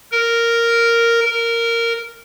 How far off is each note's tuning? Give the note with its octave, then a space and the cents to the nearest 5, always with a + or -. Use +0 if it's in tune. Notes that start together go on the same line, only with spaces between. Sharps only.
A#4 -5
A#4 -10